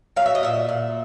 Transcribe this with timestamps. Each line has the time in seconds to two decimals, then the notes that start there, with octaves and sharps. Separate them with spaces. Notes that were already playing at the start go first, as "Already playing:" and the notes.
0.16 F#3 F5
0.26 E5
0.35 D#5
0.43 A#2 E5
0.69 A#2